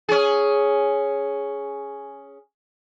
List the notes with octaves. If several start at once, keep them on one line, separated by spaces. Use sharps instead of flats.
C#4 G#4